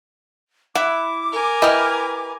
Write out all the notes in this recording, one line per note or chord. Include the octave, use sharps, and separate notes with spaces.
E4 F#5 D6
A#4 G#5
E4 G4 B4 D#5 F6